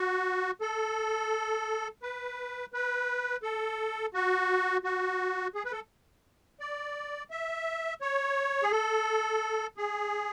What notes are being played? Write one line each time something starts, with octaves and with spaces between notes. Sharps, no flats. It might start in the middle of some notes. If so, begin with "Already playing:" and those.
Already playing: F#4
A4
B4
B4
A4
F#4
F#4
G#4
B4
A4
D5
E5
C#5
G#4
A4
G#4